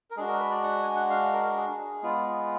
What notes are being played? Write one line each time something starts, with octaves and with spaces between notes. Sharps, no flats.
A#4
G#3 D4 F#4 G#4
A#4
B4
D5
F#5
G#5
F#5
F5
A#4
G#4
G#3 B3 F4